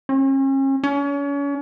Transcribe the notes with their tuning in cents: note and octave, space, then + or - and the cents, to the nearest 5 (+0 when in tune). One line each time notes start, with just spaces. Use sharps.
C#4 -40
C#4 +35